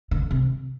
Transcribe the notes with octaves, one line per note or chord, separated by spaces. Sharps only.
D3
C3